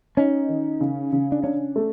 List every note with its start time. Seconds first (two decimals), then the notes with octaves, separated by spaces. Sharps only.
0.17 C#4 D#4
0.49 D#3
0.81 C#3
1.12 C#3
1.32 D4
1.44 C#4 D4
1.76 A3